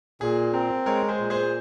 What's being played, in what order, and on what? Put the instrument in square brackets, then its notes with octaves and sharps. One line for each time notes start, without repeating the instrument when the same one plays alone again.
[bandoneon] A#2 [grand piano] G#4
[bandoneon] C4 [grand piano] A#4
[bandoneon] G#3 [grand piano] A#4 C#5
[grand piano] G#4 C5
[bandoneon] A#2
[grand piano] G#4 C5